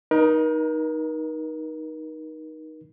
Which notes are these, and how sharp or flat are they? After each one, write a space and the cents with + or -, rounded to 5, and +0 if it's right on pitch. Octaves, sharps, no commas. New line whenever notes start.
D#4 +0 A#4 +40